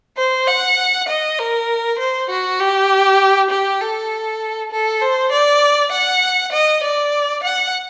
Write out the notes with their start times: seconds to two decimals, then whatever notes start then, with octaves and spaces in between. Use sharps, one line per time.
0.18 C5
0.48 F#5
1.09 D#5
1.39 A#4
1.99 C5
2.30 F#4
2.60 G4
3.50 G4
3.80 A4
4.72 A4
5.02 C5
5.32 D5
5.92 F#5
6.53 D#5
6.83 D5
7.44 F#5